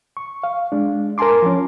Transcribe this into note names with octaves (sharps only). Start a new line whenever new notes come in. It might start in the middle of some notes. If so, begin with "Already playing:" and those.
C#6
F5
G#3 D4
A#4 G#5 A5 C6 D6
F3 C#4